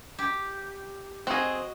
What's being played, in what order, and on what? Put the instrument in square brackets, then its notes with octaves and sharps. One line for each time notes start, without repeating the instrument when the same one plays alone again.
[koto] G4
[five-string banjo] C4 G#4 [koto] F#4 D#5